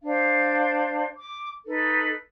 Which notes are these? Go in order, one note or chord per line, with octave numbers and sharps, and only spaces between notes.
D4 C5 F5
D6
D#4 A4 B4